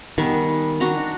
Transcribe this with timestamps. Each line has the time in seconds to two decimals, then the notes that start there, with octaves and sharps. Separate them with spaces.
0.18 D#3 G3 B3 G#5
0.80 D4 F#4 A#5